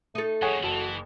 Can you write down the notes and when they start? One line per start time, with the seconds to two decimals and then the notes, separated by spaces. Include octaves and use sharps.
0.15 A3 D#4 A4
0.42 F2 A2 G#4 C#5 F#5
0.63 F#1 E3 F#4 A5